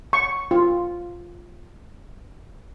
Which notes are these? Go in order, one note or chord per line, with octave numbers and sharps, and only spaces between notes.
C#6
F4